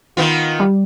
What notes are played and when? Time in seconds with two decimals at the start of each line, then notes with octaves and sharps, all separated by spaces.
0.17 D#3 B3 F4
0.60 G3